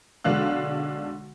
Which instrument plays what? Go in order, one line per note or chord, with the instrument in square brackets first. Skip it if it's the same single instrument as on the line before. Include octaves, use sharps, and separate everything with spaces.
[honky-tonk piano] B1 D3 G#3 D4 F5 F#6